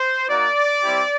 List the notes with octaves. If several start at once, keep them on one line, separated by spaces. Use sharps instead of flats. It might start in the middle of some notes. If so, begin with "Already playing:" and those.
Already playing: C5
A#3 D#4 F#4 D5
G3 C4 E4 G4